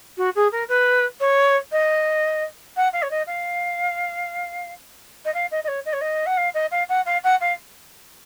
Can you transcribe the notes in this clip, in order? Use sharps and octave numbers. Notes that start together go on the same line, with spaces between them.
F#4
G#4
A#4
B4
C#5
D#5
F#5
F5
C#5
D#5
F5
D#5
F5
D#5
D#5
C#5
D#5
C#5
D#5
F#5
F5
D#5
F5
F#5
F5
F#5
F5